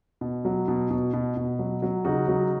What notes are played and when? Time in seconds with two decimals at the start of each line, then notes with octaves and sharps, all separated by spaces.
0.21 B2
0.45 F#3
0.68 B2
0.91 B2
1.13 B2
1.37 B2
1.59 F#3
1.82 F#3
2.05 C#3 D#4 F#4
2.28 F#3